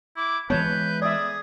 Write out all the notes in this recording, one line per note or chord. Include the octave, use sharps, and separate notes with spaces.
E4 D6
E3 G#3 B3 B4 C#5 A5 G6
G#4 D5 E5 D#6